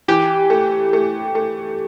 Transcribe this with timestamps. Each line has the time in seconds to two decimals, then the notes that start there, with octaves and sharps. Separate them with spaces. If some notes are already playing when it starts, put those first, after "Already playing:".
0.08 E3 G4
0.50 A3
0.93 A3
1.35 A3